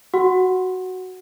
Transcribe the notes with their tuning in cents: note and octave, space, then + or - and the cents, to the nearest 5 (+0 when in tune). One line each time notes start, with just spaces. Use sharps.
F#4 +0 F#5 +0 C6 +40